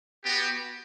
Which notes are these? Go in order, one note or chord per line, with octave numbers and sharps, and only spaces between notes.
B3 F#4 G4